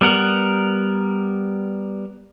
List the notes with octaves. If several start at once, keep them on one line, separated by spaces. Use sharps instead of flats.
G3 B3 A#4 F#5